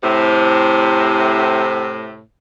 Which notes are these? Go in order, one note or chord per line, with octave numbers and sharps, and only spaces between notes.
A2 C3